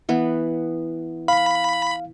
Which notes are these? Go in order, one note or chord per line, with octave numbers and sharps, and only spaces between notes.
E3 B3
F5 B5